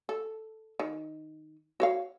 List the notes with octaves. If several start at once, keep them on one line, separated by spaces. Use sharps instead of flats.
A4
D#3
F#4 C#5 F5